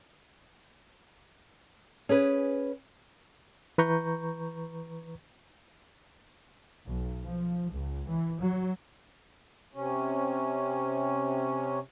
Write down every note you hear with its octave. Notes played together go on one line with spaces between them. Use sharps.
C#4 G#4 B4
E3 B4 A#5 C#6 G6
B1
F3
C#2
E3
F#3
C3 C#4